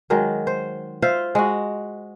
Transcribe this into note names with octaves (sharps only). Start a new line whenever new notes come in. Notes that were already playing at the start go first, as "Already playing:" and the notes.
D#3 F#3 G#3
C5
F4 C5 E5 F5
G#3 F#4